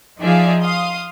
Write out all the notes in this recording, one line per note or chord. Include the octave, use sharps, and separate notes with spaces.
F3 D#4 G#4 D5 E5 F5
F5 C6 D#6